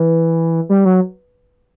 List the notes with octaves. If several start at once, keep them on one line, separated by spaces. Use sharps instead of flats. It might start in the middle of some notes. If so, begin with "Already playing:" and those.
Already playing: E3 B4
G3
F#3